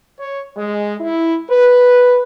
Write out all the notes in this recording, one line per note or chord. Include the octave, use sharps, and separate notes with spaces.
C#5
G#3
E4
B4